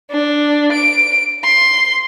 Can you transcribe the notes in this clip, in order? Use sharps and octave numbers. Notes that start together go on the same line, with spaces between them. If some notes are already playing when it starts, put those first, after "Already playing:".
D4
D7
C6